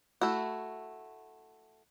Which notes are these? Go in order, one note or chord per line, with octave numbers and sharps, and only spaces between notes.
A3 E4 F#4